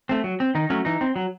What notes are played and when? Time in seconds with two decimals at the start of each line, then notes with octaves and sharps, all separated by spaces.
0.09 A3 C4
0.24 F#3
0.40 C4
0.55 D#3 D#4
0.70 F#3 A3 C#4
0.85 E3 D#4
1.01 C4
1.16 F#3